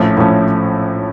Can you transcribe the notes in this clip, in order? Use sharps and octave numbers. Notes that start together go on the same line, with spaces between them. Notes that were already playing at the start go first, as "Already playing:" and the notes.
Already playing: A#1 A2 F3 A3 C#4
A#1 A2 F3 A3 C#4